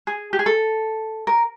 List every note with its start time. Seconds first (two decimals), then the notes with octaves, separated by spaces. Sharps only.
0.07 G#4
0.33 G4
0.39 G#4
0.46 A4
1.27 A#4